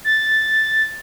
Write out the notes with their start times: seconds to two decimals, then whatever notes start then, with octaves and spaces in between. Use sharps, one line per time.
0.04 A6